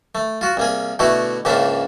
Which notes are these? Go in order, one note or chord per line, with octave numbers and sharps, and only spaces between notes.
A3
F4 F#4
C2 A#3 G#4
B2 D3 A3 E4 F#4
C#2 G#2 C#3 A#3 D4 E5